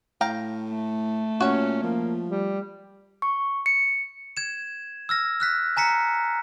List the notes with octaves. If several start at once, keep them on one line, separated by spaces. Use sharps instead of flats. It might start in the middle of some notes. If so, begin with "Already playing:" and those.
A2 F5 G5 A#5
A3
A#2 C#4 F#4 C#5
F3 A#3
G3
C#6
C#7
G#6 E7
E6 F6 A#6
F6 F#6 B6
G#5 A#5 B6 C#7